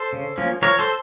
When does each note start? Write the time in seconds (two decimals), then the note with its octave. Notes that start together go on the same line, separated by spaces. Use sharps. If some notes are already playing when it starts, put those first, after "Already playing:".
Already playing: A4 C5
0.13 C#3
0.38 F3 A#3 C#4
0.62 F3 A#4 C#5
0.79 A4 C5